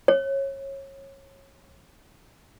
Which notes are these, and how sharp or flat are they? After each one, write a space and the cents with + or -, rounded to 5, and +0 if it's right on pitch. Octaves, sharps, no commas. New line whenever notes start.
C#5 -25